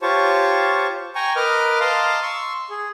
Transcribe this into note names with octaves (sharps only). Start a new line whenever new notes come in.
F4 G4 C5 C#5 A5 C#6
G5 G#5 A#5 C#6
A#4 B4 D#5 D6 F6
D#5 F5 A5 A#5 C6 D6
C6 C#6 E6
G#4